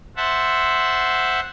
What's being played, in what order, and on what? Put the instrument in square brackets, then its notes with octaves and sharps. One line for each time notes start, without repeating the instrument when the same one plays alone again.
[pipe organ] C5 E5 F#5 A5